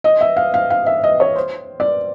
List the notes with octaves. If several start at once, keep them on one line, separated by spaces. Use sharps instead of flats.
D#5
E5
F5
F5
F5
E5
D#5
C#5
C5
D5